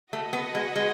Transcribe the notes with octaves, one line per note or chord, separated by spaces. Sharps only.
A3 F#4 B4 D#5 F#5
B3
G#3
G#3